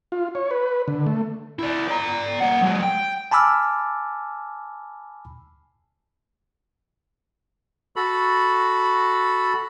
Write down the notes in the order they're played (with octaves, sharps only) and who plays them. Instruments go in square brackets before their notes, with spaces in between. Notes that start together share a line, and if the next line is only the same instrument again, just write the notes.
[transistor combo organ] F4
C#5
B4
D3
A3
[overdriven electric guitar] E4 D5
D5 A#5
A#3 F#5
F#3 G#3
G5
[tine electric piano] G#5 A5 B5 D6 E6 F6
[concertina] F#4 A4 B5